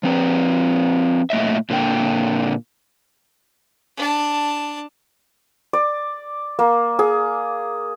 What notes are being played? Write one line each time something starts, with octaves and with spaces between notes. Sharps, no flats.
F3 C4 B4
A#2 A3 D#5 E5
A#2 D3 A#3 G5
D4 A5
D5
A#3
G#4